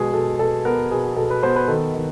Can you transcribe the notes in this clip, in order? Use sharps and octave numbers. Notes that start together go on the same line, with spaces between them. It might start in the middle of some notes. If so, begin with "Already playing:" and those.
Already playing: B2 G#3 G#4
B2 A4
B2 A4
B3 A#4
B2 G#4
B2 A4
B4
B3 C5
B4
D#3 A4
D#3